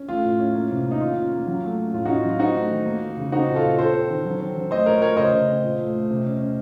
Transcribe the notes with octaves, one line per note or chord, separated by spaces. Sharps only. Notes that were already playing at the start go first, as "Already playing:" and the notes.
Already playing: C#4
A3 F4
A2
C#4
A#3
C3
A#3
D#4
D#3 F4
C#4
A#3
F#3
A3
C#4
A2 F4
C#4 D#4 F#4
F#3 F4
C4 D#4 F#4
A3
D#3
A#3
A#3
C#3
C4 D#4 F#4
A#2
F4 A4
A#2
C4 A4 C5
C4
D#3
F#3
C4
F#3
A3 C5 D#5
A#2 A#4 C#5
A3 A#4 C#5
C#3 C5 D#5
C#3
C4
A#2
A3
A3
C3
C#4
C#4